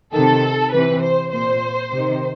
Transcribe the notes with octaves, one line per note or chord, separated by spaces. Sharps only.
C3 D#3 A4
C3 E3 B4
C5
A#2 C5
C3 D#3